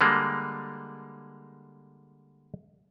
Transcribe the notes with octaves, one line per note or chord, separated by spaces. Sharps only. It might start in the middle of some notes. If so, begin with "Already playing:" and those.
D3 G3 G#3 A#3